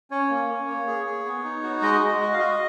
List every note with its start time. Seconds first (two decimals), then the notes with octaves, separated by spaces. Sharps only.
0.11 C#4 C#5
0.30 A#3
0.49 C#4
0.68 A#3
0.87 G#4
1.07 G#4
1.25 B3
1.44 D#4
1.63 F#4
1.82 G#3 D#5
2.01 G#3
2.20 F#4
2.33 F5
2.39 F#4 D#5